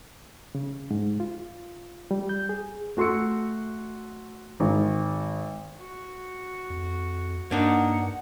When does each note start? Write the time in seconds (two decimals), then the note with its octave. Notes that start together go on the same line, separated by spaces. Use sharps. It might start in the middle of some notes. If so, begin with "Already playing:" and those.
0.55 C#3
0.91 G#2
1.20 F4
2.11 G3
2.29 G6
2.49 G#4
2.97 A3 F#4 C6 E6 C#7
4.60 G#1
5.79 F#4
6.70 F2
7.51 G2 A#3 D4 D#4 F#5